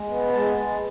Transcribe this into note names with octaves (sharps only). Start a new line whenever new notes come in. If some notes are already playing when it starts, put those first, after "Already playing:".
Already playing: G#3
B3
G#3 A5